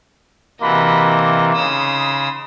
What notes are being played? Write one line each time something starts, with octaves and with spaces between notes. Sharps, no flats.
C3 E3 A#3 F#4 D#5 B5
C#3 D#4 B5 C6 D#6 E6